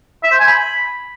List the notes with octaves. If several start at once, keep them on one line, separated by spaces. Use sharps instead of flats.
E5
C5
G#5
B5